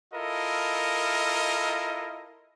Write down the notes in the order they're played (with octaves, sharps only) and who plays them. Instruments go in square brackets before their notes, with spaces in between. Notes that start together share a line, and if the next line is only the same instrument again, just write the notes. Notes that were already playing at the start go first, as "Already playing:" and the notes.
[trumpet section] E4 F4 A4 A#4 D#5